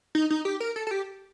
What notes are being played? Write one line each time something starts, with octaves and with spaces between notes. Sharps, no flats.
D#4
D#4
G4
A#4
A4
A4
G4